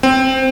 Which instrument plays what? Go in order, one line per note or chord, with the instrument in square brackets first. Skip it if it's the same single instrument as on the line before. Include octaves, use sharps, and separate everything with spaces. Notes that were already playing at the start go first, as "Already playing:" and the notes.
[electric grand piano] C4